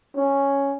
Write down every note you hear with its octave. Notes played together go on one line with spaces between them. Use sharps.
C#4